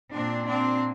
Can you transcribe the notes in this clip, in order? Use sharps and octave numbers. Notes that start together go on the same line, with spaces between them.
A#2 C4 D4
C4 D4